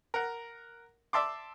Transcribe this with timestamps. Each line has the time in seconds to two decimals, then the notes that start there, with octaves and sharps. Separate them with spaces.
0.14 A#4 F#5
1.13 D5 E5 A5 C6 D6